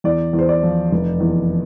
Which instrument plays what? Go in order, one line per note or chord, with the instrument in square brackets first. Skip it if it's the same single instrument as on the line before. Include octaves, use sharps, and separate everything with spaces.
[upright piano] E2 D5
E2
C5
D5
F3
F1
E2